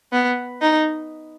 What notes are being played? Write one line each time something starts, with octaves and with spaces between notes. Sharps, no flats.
B3
D#4